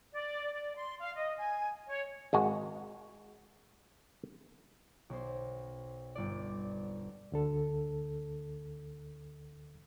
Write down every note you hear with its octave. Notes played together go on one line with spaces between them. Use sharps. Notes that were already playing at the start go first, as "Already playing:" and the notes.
D5
D5
C6
F5
D#5
G#5
C#5
G#1 G#3 F#4
B1 C5
G1 D5
D2 D3 A4